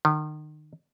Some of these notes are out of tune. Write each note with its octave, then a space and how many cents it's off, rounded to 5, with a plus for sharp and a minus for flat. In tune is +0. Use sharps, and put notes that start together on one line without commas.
D#3 -35